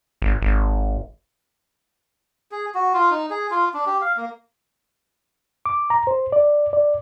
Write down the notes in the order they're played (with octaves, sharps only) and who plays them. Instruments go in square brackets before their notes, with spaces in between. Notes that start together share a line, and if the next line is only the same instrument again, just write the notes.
[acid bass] G#1
G#1
[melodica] G#4
F#4
F4
D#4
G#4
F4
D4
G4
F5
A#3
[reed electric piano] D6
A#5
C5
D5
D5